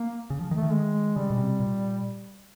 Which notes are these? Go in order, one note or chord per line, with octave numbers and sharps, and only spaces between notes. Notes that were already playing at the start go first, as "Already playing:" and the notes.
Already playing: A#3
C#3
F3
D#3 A3
D#3
G#3
C#3 G3
B2
C3
A#2